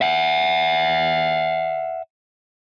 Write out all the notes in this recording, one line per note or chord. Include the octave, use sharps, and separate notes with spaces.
E5 F#5